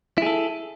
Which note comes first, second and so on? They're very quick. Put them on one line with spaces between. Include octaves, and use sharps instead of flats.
E4 G#4 A4